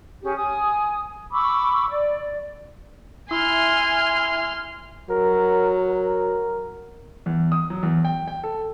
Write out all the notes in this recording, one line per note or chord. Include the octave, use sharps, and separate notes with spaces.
C#4 G4 G#4
G#5 D#6
B5 C#6 D6 E6
D5
E4 G#5 C6 F6
F#3 A#4
A#4
E2
D#6
F#3
E2
G5
G5
A4